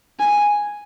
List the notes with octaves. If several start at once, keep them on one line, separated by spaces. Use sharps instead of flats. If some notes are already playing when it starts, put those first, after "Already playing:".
G#5